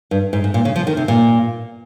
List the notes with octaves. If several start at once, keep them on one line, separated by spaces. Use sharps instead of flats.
G2
G#2
G#2
A#2
C#3
F3
D#3
C3
A#2